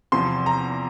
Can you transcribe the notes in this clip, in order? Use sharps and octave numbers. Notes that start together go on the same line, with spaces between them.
E2 C3 F3 C6
A#5